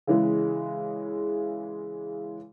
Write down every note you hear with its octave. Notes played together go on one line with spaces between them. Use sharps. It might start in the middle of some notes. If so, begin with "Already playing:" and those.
C#3 E3 G#3